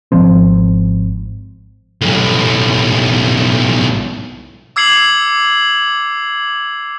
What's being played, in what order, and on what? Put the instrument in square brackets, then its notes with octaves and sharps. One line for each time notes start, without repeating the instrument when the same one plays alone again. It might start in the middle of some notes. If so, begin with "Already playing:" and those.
[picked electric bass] G#1 F3 C4
[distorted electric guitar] B1 A2
[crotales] D6 E6 G#6 C7 C#7 F#7